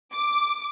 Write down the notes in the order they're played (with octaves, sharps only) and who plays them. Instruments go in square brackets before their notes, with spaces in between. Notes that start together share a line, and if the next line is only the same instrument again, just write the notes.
[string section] D6